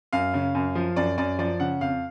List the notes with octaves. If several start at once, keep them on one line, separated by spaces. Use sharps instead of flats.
F#2 F5
C#3
F#2
F3
F#2 D5
F#2 D5
F3 D5
C#3 F#5
F2 F5